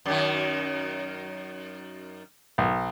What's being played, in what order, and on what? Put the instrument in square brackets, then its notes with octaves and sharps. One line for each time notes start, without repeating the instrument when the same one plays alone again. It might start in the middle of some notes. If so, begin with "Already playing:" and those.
[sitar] F#2 D#3
[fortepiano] B1